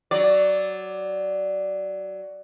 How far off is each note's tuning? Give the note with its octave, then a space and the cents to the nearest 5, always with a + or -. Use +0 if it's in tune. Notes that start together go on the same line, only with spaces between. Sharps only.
F#3 +15 D5 +0